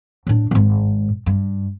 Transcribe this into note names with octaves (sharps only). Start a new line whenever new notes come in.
A2 D4
G#1 G#2
G2